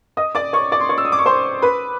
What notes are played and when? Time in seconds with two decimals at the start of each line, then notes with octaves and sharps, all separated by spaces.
0.17 D#5 D#6
0.35 D5 D6
0.53 C#5 C#6
0.72 D5 D6
0.80 C6
0.89 C#5 C#6
0.98 E6
1.05 D#6
1.12 D6
1.19 C#6
1.26 C5 C6
1.62 B4 B5